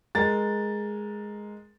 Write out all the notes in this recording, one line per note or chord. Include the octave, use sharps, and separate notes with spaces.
G#3 A#4 A6